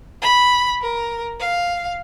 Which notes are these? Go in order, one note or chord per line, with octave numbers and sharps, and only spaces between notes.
B5
A#4
F5